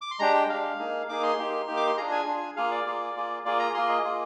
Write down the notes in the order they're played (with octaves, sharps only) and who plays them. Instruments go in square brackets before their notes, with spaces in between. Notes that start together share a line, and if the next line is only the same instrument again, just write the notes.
[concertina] D6
C6
G#3 D4 G4 A#5
G5
G#3 D4 G4 F5
A#3 D#4 G#4
A#3 D#4 G#4 D6
C6
A#3 D#4 G4
A#3 D#4 G4
D6
C6
D4 F4 G#4 A#5
G#5
D4 F4 G#4
A#3 F4 G#4 F5
D5
A#3 F4 G#4
A#3 F4 G#4
A#3 F4 G#4 D5
A#5
A#3 F4 G#4 C6
D#5
A#3 F4 G#4